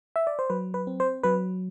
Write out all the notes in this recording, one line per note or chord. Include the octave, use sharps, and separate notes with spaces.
E5
D5
C5
F#3 B4
B4
C4
C5
F#3 B4